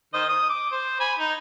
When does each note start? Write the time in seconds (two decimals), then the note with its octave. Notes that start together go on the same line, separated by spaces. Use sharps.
0.14 D#3 C5 D#5
0.29 D#6
0.49 D6
0.72 C5
1.00 G#5 B5
1.19 D#4